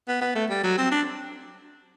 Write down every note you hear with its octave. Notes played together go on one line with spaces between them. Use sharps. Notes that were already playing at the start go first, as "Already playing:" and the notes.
B3
B3
A3
G3
F#3
C4
D4